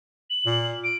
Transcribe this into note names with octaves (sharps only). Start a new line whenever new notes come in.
F#7
A#2
D7